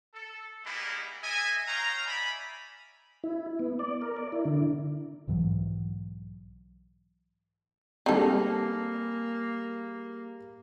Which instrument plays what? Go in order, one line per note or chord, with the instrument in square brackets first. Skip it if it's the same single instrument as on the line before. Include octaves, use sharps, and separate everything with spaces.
[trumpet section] A4
G3 G#3 A#3 B3 D#4 E4
A4 D#5 E5 G#5
C#5 D#5 F5 G5 A#5
D5 E5 G#5 B5
[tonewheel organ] E4
B3
D5
A#4
D5
E4
D3
[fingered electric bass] B1 G#2 E3 F#3
[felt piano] G3 G#4 [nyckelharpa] A#3 [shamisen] C4 D#4 A4